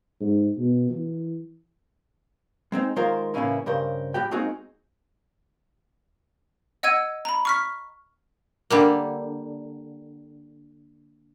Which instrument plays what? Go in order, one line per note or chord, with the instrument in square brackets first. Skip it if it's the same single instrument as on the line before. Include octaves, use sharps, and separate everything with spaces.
[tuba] G#2
B2
E3
[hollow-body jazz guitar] G#3 C4 D4 D#4
D#3 G#3 F4 A#4 C5
A2 C#3 E3 A#3 C#4 E4
G2 C#3 A#4 C5
A2 G3 F#4 G4 G5
G#3 A#3 C4 D#4 F#4 G#4
[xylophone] D#5 F#5 E6 G#6 D#7
A#5 B5
C#6 F6 B6
[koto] D3 G3 A#3